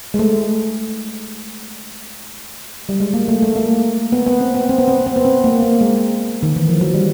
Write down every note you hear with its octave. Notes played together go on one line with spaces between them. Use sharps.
G#3
A3
G3
G#3
A#3
A3
A3
A#3
B3
B3
C4
B3
C4
B3
C4
C4
B3
C4
A#3
A#3
G#3
D#3
E3
F3
F#3
G3